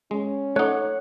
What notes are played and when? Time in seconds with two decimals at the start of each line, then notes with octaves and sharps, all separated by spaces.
0.11 G#3 C#4
0.56 A3 D#4 A4 C#5 F#5 F#6